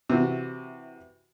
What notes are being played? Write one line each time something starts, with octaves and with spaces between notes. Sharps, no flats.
C3 E3 F#4